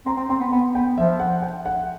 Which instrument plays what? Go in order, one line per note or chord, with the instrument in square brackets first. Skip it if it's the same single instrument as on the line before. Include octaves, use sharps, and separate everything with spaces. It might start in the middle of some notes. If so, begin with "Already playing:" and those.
[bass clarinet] C4 [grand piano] A#5
[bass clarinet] C4
[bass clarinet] C4 [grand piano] C6
[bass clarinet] B3
[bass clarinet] B3 [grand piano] B5
[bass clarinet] B3 [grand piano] G5
[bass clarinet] F3 [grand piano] E5
[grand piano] F#5
G5
F#5